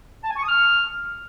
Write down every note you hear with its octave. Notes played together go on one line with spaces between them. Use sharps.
A5
G#5
C#6
D#6
F6